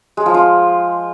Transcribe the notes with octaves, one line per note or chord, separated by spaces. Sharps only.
G#3
F3
F4